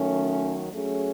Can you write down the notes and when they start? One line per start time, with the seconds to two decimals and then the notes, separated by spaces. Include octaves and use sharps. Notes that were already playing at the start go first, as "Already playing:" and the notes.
Already playing: D#3 F#3 A3 C#4
0.73 F#3 A3 C#4 G#4